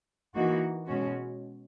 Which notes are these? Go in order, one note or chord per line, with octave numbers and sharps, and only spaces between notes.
E3 A#3 D#4 F#4
B2 G#3 C#4 F#4